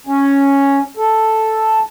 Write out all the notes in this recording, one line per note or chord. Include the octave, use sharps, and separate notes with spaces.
C#4
A4